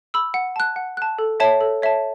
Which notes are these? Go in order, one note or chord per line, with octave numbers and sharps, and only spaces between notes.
B5 E6
F#5
A5 F#6
F#5
A5 F#6
A4
C#5 E5 A5
A4
C#5 E5 A5